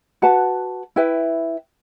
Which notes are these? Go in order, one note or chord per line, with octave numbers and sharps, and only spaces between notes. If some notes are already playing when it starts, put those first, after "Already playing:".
F#4 B4 F#5 A5
E4 B4 E5 G5